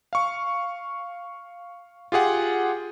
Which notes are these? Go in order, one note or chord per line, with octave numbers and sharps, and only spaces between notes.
F5 C#6
F4 G4 G#4 F#5